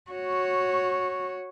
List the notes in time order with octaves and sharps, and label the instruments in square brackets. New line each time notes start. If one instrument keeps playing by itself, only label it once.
[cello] F#4 C#5